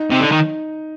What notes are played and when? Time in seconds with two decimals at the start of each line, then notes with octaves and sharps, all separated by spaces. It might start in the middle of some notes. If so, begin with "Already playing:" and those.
Already playing: D#4
0.11 C3
0.21 D3
0.32 D#3